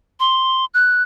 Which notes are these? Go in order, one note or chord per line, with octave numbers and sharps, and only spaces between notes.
C6
F#6